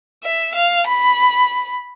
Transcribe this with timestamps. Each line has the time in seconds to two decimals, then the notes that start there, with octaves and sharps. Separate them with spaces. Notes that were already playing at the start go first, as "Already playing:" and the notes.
0.24 E5
0.55 F5
0.87 B5